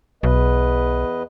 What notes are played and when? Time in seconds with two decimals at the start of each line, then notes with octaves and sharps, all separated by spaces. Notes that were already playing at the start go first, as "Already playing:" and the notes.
0.23 B1 E2 B4 D#5